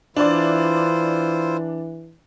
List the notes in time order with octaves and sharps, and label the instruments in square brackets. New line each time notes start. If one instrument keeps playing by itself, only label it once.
[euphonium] E3 [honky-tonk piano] D4 D5 [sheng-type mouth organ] E4 F4 C5